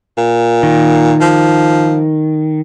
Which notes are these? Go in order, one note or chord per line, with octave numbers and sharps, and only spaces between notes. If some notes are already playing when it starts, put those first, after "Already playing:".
A#2
D#3
F3